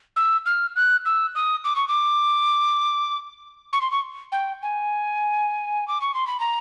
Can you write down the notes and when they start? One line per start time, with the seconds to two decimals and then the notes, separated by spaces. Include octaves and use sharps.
0.16 E6
0.46 F6
0.76 F#6
1.06 E6
1.35 D#6
1.64 D6
1.76 C#6
1.88 D6
3.73 C#6
3.81 C6
3.91 C#6
4.32 G5
4.62 G#5
5.88 D6
6.01 C#6
6.14 C6
6.27 B5
6.40 A#5